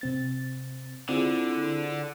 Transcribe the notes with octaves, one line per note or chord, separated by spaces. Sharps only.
C3 C4 A6
D3 C4 E4 F4 G#4